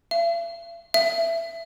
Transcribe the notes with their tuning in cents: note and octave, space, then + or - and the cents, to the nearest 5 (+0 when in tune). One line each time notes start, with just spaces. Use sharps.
E5 +45
E5 +15